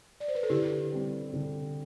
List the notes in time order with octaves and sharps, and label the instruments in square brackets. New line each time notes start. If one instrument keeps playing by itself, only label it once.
[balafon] D5
C5
B4
A4
[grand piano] D3 [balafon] E4 G4
[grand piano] G3 C4
D3